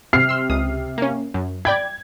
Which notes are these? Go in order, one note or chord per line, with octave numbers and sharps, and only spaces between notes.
C3 F6 C7
C6 E6
C#2 D#6
A#3 C#4
F#2
D5 G5 B5 G#6